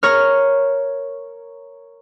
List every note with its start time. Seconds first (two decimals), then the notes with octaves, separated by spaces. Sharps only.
0.03 A#4 C#5 F6